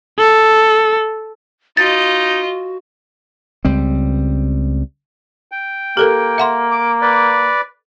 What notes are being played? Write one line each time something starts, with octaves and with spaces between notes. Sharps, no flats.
A4
D#4 F4 F#4 D#5 A6
C#2 G3 C4
G5
A#3 G4 A4 A#4
E5 F#5 C6
D6
B4 D5